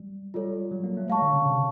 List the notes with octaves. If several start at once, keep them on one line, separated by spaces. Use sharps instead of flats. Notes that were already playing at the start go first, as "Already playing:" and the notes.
Already playing: G3
G3 F4 A4 C#5
F#3
A#3
A3
G#3 C#5 F5 A5 C#6
D3
C#3
C3